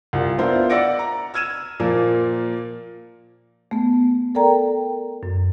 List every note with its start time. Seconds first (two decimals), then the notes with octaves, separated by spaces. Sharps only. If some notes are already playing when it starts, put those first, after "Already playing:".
0.13 C2 F4
0.38 B3 D4 E4 F4 A#4 C5
0.70 D5 F#5 E6 A#6 C#7 D7
0.99 A#5
1.34 E6 F6 G#6 D#7 E7
1.80 A#2 F3 A#3 A#4
3.71 A3 B3
4.35 A4 A#4 D5 G5 A#5
5.23 F#2